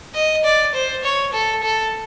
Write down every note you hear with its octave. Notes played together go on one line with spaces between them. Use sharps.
D#5
D5
C5
C#5
A4
A4